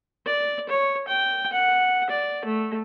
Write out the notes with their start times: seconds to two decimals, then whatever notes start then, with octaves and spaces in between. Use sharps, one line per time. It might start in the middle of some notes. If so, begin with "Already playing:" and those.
0.26 D5
0.69 C#5
1.08 G5
1.53 F#5
2.10 D5
2.46 A3